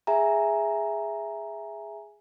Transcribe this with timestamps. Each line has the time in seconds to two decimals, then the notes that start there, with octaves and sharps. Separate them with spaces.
0.07 G#4 E5 G#5 A#5